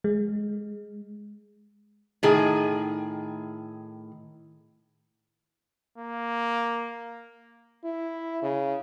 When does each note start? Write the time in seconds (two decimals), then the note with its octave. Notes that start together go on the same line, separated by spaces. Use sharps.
0.04 G#3
2.23 A2 D#3 G#4
5.98 A#3
7.84 E4
8.43 C#3